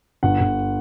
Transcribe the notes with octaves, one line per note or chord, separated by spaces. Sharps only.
G1 F#5
G1